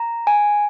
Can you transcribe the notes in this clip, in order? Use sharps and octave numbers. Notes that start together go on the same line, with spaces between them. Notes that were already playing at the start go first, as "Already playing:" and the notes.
Already playing: A#5
G#5